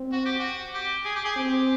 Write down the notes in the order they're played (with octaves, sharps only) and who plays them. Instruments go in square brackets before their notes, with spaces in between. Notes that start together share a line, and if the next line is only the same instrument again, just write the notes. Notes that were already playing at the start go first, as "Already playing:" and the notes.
Already playing: [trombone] C4
[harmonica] F#4
G4
F#4
G4
G#4
G4
G#4
[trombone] C4 [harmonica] G4